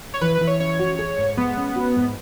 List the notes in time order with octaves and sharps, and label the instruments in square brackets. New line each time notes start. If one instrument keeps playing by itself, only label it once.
[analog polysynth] C#5
[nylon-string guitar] E3 [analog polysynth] B4
[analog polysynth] B4
[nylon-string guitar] E3
[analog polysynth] C#5
[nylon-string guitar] C#4 [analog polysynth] C#5
[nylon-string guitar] F#4
G#4
G#2
[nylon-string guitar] G#3 [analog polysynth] B3
[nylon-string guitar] C#4
F#4
G#2